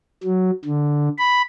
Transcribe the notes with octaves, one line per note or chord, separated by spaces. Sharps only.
F#3
D3
B5